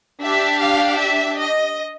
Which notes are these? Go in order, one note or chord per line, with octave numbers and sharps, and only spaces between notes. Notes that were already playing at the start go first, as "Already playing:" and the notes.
D4 G4 E5
F5
E5
D#5